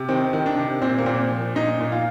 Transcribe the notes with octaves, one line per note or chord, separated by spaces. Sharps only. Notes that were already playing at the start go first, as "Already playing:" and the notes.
Already playing: C3
D#3 C4
D#3
D4
C3
A#2 C4
A#3
A#2 C4
F3
A#2 D#4
A#2
F4